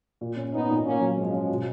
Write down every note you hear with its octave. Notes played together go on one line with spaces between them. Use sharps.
A#2
C#4
B3 C#4 D#4
A#2
A#2 A#3 C#4
F#3
F3 G#3 C#4
C#4
B2